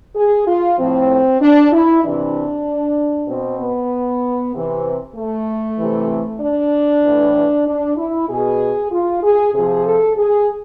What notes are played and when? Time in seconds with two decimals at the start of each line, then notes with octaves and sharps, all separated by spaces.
0.15 G#4
0.46 F4
0.78 A2 F3 C4
1.41 D4
1.72 E4
2.03 C3 E3 D4
3.28 B2 C4
3.59 B3
4.54 C3 E3
5.16 A3
5.78 C3 E3
6.40 D4
7.03 A2 E3
7.66 D4
7.97 E4
8.28 B2 G#4
8.91 F4
9.22 G#4
9.53 C3 F3 G#4
9.85 A4
10.17 G#4